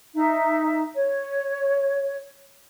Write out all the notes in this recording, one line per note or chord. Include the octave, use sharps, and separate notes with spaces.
D#4 E5
C#5